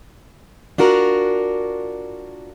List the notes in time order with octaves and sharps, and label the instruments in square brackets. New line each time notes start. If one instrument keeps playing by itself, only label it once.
[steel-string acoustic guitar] D4 F4 F#4 A#4